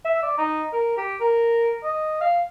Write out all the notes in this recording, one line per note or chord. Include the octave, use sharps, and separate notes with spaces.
E5
D5
D#4
A#4
G4
A#4
D#5
F5